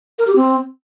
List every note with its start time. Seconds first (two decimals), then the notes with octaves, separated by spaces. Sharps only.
0.19 A#4
0.27 G4
0.36 C4